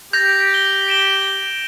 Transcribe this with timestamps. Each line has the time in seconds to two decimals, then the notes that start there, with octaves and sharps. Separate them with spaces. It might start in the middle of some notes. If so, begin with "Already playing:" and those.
0.13 G4 G6 A6 A#6 F7
0.54 G7
0.88 D7 E7 G7